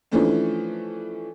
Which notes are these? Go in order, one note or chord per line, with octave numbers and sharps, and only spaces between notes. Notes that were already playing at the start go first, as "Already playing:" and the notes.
E3 F3 A3 C#4 D4